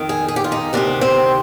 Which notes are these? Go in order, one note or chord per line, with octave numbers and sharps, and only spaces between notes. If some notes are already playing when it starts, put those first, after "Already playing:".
Already playing: F2 D#3
G#4
G#4
G4
F4
D#4
D2 C3 D#3 D4
C4